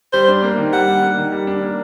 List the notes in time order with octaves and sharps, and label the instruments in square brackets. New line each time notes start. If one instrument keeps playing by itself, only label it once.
[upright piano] G3 [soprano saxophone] C5
[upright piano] D4
A#3
D#3
[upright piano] G3 [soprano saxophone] F#5
[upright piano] D4
A#3
D#3
G3
D4
A#3